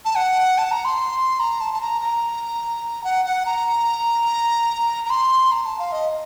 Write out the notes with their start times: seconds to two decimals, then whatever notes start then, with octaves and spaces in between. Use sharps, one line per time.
0.05 A5
0.16 F#5
0.58 A5
0.71 A#5
0.85 C6
1.39 A#5
1.60 A5
1.74 A5
1.81 A#5
2.01 A#5
3.04 F#5
3.25 F#5
3.46 A#5
5.05 A#5
5.10 C6
5.51 A#5
5.65 A5
5.79 F5
5.92 D#5